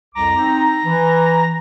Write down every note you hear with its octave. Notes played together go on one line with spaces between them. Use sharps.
C2 F2 A#5 D6
C4 D#4
E3